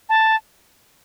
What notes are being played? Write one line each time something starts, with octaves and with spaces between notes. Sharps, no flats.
A5